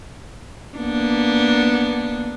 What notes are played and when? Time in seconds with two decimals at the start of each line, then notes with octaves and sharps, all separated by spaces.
0.78 A#3 B3 D4